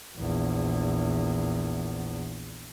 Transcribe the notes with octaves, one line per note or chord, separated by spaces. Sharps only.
A#1 E2